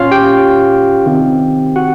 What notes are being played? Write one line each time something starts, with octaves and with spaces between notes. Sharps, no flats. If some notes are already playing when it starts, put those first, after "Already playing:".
Already playing: A#2 C#4 F4 C#5 F5
G4 G5
C3 D#3
F#4 F#5